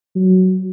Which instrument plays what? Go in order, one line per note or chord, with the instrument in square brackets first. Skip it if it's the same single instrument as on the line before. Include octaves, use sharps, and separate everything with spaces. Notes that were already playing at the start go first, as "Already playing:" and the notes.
[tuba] F#3